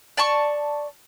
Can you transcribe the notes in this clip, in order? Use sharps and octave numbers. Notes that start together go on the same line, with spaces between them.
D5 A5 C#6